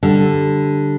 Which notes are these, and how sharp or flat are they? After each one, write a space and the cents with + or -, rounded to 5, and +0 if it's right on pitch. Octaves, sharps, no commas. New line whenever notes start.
D3 +0 G3 +0